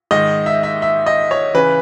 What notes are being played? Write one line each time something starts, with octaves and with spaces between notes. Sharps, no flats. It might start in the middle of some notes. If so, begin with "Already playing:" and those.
G#2 D#3 D#5
E5
E5
E5
D#5
C#5
C#3 E3 B4